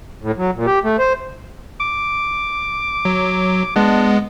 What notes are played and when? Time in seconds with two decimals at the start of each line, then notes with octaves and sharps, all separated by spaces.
0.22 A2
0.37 F#3
0.55 A#2
0.67 G4
0.84 A3
0.99 C5
1.80 D6
3.05 F#3
3.76 G#3 B3 D4